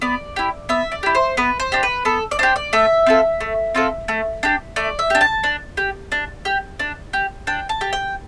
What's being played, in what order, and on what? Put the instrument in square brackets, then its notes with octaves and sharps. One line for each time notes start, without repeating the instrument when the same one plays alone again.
[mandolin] B3 D5
E4 G4
B3 E5
D5
E4 G4
C5
B3 B4
C5
D4 G4
B4
B3 A4
D5
D4 G4 C5
D5
A3 E5
C4 F4 A4
A3
C4 F4 A4
A3
D4 G4
A3 D5
E5
D4 G4
A5
D4
G4
D4
G4
D4
G4
D4 G5
A5
G4
G5